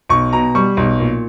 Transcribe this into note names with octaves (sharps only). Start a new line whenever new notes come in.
B1 C#6
B2 A#5
G3 C#6
B1
A#2